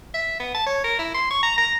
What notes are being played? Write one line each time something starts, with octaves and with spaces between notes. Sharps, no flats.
E5
B3
A5
C#5
A#4
E4
C6
C#6
A#5
A#5